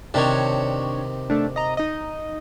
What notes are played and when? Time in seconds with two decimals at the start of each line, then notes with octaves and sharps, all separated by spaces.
0.14 C3 D#3 D4 C#5
1.30 A3 D4
1.56 D#5 A#5
1.77 D#4 D#5